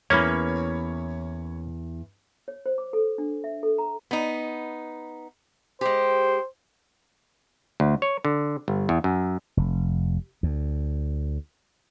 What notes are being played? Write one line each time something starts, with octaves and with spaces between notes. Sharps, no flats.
E2 A#3 C#4 E4 C#5 B5
C#5
C5
D6
A4
D4
E5
A4
A#5
B3 D#4
G#3 G4 C5
D2
C#5
D3
G1
E2
F#2
F1
D2